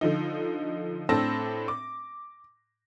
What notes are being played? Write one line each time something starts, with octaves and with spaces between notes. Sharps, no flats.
D3 F3 D#4
A2 C4 D4 A5 E6 A#6
D6